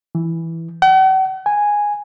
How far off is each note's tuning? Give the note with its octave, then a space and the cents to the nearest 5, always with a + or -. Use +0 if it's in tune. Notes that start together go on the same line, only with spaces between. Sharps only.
E3 +0
F#5 +45
G#5 -5